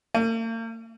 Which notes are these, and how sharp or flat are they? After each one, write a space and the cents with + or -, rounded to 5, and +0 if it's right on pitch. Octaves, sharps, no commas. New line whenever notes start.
A#3 -45